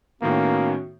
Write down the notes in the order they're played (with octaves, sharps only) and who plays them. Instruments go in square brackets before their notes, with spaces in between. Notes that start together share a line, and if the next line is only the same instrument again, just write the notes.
[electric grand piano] A2 D#3 B3 [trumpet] A#3 [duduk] C#4 [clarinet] F#4